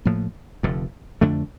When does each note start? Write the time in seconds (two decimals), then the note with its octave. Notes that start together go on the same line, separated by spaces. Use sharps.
0.05 A2 F3 A#3
0.63 F1 F2 D3
1.21 F2 D3 A3 D4